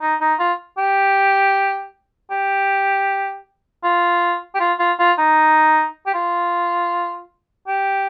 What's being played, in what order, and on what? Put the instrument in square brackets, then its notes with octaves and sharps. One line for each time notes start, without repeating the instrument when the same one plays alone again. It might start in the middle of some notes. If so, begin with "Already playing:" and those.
[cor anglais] D#4
D#4
F4
G4
G4
F4
G4
F4
F4
F4
D#4
G4
F4
G4